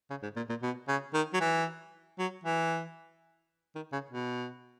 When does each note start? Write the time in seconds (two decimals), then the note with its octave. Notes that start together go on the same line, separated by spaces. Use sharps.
0.10 C#3
0.23 G#2
0.36 A#2
0.49 A#2
0.63 B2
0.88 C#3
1.14 D#3
1.34 F#3
1.41 E3
2.19 F#3
2.44 E3
3.76 D#3
3.93 C#3
4.11 B2